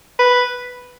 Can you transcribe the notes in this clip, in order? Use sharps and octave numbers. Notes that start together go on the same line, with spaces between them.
B4